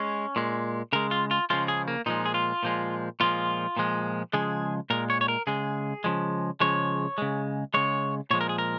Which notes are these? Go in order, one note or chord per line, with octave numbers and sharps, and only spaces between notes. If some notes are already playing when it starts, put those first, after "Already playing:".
Already playing: G#3 C#4
A#2 G#3
C#3 G#3 A#4
F4
F4
C#3 F3 G#3 F4
G#4
A#3
A#2 F3 G#3 D#4
G#4
F4
A#2 F3 G#3
A#2 F3 G#3 F4
A#2 F3 G#3
C#3 F3 G#3 G#4
A#2 G#3 A#4
C#5
C#5
A#4
C#3 G#3 G#4
C#3 F3 G#3
C#3 F3 G#3 C#5
C#3 G#3
C#3 G#3 C#5
A#2 F3 G#3 C#5
A#4
G#4
A#4